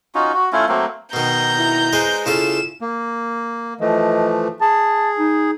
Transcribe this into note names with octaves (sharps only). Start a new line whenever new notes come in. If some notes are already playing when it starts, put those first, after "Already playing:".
C#4 D#4 F4 F#4
F#4
A3 C#4 E4 F4
F#3 A3 A#3 C4
B2 D#3 A#5 G6
E4
G#3 B4 C5
C#3 E4 F4 A4 E7
A#3
E3 F3 A3 D#5
G#4 A5
D#4